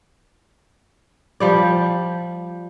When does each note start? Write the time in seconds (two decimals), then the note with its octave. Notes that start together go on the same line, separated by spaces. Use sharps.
1.40 F3 G3 D5